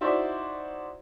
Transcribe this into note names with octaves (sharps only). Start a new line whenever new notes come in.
D#4 E4 F#4 C5 D5 E5